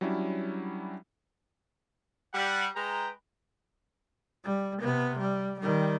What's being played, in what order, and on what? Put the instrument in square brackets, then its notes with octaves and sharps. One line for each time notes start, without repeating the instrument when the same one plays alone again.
[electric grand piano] F#3 G3 C#4 D4 E4
[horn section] G3 F#5
G#3 B4 G5 A#5
[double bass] G3
C3 B3
G3
D#3 G3